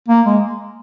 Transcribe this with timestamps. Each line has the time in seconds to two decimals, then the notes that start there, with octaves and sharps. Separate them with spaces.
0.08 A#3
0.26 G#3